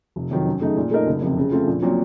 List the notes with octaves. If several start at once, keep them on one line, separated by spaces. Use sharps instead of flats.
F1
F2 D#3 F#3
F#2
C#3 A3 D#4
A#2
A3 D#4 A#4 D#5
F#1
F2 C3
C#3
A3 C4 F4
A#1
A#2 F#3 C4